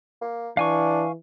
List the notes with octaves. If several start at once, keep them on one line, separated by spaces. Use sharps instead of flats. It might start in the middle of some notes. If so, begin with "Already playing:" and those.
A#3
E3 D4 F5 G#5 C#6